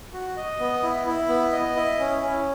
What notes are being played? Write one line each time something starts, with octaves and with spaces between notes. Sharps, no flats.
F#4
D#5
B3
E4
E4
B3
D#5
E4
C#4
C#4